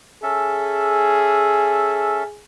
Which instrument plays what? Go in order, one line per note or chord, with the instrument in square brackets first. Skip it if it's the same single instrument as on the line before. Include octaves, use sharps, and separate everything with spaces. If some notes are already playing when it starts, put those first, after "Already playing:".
[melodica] C#4 A4 E5 [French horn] G#4